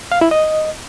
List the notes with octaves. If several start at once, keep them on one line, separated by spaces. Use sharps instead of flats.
F5
E4
D#5